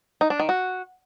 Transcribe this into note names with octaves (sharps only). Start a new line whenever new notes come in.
D#4
D4
D#3
F#4